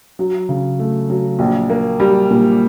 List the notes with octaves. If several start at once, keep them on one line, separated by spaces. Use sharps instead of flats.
F#3
C#3
A3
F#3
A#1
A#3
G3
A#2